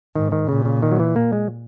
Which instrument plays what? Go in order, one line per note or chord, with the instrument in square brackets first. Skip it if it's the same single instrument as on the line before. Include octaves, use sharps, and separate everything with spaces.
[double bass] G#2 [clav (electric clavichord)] D#3
[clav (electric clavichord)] D#3
[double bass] A#2 [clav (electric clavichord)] C#3
[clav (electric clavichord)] C#3
D#3
F#3
E3
A#3
G#3